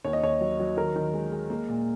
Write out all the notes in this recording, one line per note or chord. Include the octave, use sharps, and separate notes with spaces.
D#2 C#5
D#5
D#2 C#5
F#3
F#3
D#3 A#4
D#3
G#3
G#3
A#3
A#2